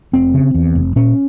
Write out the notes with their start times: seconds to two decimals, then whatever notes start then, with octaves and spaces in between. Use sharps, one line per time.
0.13 F1 C4
0.34 C#3
0.54 E2
0.75 F1
0.96 A#2 C#4